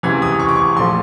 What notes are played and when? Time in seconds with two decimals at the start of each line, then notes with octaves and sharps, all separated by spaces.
0.03 C#2 C3 E3 G#6
0.22 D#6
0.40 C#6
0.49 D6
0.56 C#6
0.76 A#1 F3 A3 C6